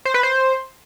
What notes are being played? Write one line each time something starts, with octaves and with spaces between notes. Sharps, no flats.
C5
B4
C5